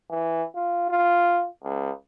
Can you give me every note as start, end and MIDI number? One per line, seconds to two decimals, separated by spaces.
0.10 0.44 52
0.55 0.87 65
0.89 1.47 65
1.63 1.91 37